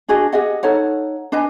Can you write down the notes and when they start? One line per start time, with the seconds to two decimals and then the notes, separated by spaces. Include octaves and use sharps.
0.08 D4 F#4 G#4 D#5
0.33 G4 G#4 D#5 F#5
0.63 D#4 A4 C#5 F#5
1.32 D4 B4 D#5 G#5